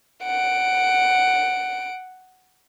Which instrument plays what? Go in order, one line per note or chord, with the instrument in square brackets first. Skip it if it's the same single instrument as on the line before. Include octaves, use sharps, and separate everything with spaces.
[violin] F#5 D7